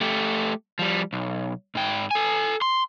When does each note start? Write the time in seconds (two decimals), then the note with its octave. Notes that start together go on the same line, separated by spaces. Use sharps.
0.01 A3 G4
0.79 F3 G3
1.13 B1
1.75 G#2 G5
2.11 A4 G#5
2.62 C6